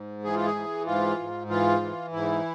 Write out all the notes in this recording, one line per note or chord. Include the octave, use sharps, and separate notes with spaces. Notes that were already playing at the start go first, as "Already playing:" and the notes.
Already playing: G#2
E3 G#4
F4
G#4
E3
G#2 F4
G#2
E3 F4
E3
G#2 E4